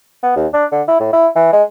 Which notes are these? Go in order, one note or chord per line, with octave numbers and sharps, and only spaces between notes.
B3
D#2
D4
D3
E4
A2
E4
E3
G#3